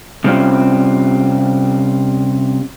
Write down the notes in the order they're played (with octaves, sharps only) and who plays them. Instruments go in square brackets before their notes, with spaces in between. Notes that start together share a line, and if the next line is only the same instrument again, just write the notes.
[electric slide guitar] C3 G3 C4 C#4 F4